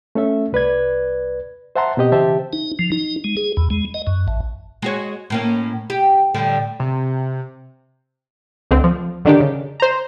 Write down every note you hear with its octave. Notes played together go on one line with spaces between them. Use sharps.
A3 C#4 A4 E5
C2 B4 D5 G#6
C5 E5 F#5 A5 A#5 C6
B2 C4 G4 D#5
C#3 E3 G4 C5 E5 A5
D#4
F3
D#4
G#3
G#4
E2
G#3
D#5
F#2
A1
G#3 F#4 C#5
A2 A#3 C#4
G4
A2 D3 G3
C3
C#2 D3 A3 C4
F3
D3 D#3 D4 D#4 G4
C#3
C5 A#5